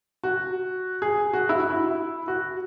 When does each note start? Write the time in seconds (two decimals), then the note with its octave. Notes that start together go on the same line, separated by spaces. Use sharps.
0.24 F#4
1.02 G#4
1.33 F#4
1.49 E4
1.60 F#4
1.70 E4
2.28 F#4